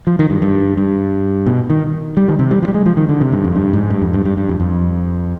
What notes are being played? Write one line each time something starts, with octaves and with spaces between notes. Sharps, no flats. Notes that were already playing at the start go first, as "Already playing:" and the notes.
F3
D#3
G2
G2
G2
B2
D#3
G3
D#3
C3
G3
F3
G3
G#3
F3
D#3
D3
C3
G2
F2
G2
G#2
G2
F2
G2
G2
G2
F2
F2